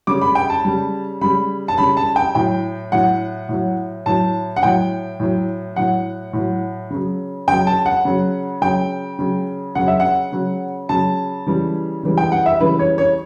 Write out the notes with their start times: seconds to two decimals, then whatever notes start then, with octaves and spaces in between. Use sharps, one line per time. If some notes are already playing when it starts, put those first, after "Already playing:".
0.07 C#3 G3 D6
0.21 B5
0.35 G5
0.50 A5
0.65 C#3 G3
1.21 C#3 G3 B5
1.68 A5
1.78 C#3 G3 B5
1.97 A5
2.16 G5
2.35 A2 F#3 G5
2.92 A2 F#3 F#5
3.49 A2 F#3
4.06 A2 F#3 A5
4.56 F#5
4.63 A2 F#3 G5
5.20 A2 F#3
5.76 A2 F#3 F#5
6.33 A2 F#3
6.90 C#3 F#3
7.48 C#3 F#3 G5
7.67 A5
7.86 F#5
8.05 C#3 F#3
8.61 C#3 F#3 G5
9.19 C#3 F#3
9.75 C#3 F#3 F#5
9.88 E5
10.00 F#5
10.32 C#3 F#3
10.89 C#3 F#3 A5
11.46 C#3 E3 G3
12.03 C#3 E3 G3
12.17 G5
12.32 F#5
12.46 E5
12.60 C#3 E3 G3 B4
12.79 C#5
12.98 C#5